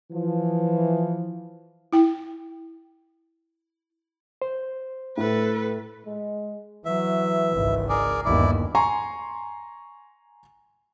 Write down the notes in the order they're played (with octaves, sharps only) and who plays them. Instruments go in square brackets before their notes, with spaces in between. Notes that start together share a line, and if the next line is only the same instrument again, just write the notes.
[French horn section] E3 F3
[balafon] E4 G5
[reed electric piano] C5
[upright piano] A2 [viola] A4 B4
[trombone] G#3
[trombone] E3 [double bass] F#3 [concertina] E5
[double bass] G#1 C#2
[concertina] G#4 A#4 D5
[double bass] G1 D#2 [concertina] E4 D5
[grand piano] G#5 A#5 C6 C#6